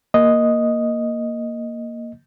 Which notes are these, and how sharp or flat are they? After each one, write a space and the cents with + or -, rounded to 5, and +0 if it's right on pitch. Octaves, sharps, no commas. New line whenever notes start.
A#3 +0 D#5 +0